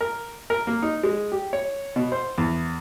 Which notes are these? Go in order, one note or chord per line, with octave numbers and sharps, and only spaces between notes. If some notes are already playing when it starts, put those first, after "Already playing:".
A#4
A#4
A#3
D#4
G#3
G4
C#5
B2
C5
E2